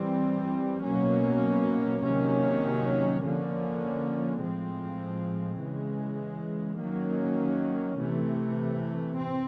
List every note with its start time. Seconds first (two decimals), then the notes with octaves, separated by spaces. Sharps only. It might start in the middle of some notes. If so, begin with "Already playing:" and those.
Already playing: E3 G3 C4
0.84 B2 F#3 A#3 C#4
2.03 C3 D#3 F#3 A#3 C#4
3.22 D3 F3 A#3 C#4
4.42 A2 F3 G#3 C4
5.60 C#3 E3 G#3
6.79 D#3 F#3 A#3 C#4
7.99 C3 E3 A3
9.17 C4